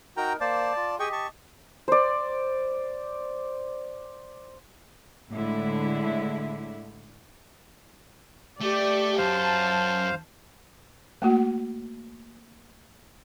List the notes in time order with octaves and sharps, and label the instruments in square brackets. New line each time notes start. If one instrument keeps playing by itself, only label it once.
[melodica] D#4 A#4 [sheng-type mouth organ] F#4 G5 A#5
[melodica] A#3 C5 [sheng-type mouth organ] D5 A5
[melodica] F4
[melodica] G4 D#5 [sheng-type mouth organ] G#4 G5 C#6
[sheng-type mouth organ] A5 C#6
[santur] C5 D5
[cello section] A2 D3 G#3 E4
[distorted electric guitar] A3 [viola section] G4 D5
[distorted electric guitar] F#2 [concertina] C5 F5 [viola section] A5
[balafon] A3 A#3 F#4